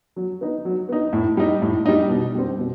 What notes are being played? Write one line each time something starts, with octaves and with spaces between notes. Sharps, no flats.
F#3
B3 D#4
F#3
B3 D#4
A2
G3 D#4
A2
G3 D#4
B2
G3 C4
B2